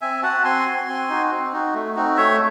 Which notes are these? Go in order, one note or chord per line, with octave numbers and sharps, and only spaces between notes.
C4 E5 G#5
F#4 F#5 A5
C4 G#5 C6
F#4
C4
D#4 F#4
C4
D#4 F#4
A3
C4 D#4 F#4
A3 C#5 E5